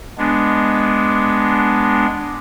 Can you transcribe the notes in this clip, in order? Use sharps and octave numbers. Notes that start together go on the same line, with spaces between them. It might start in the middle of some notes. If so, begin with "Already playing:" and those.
G#3 B3 D4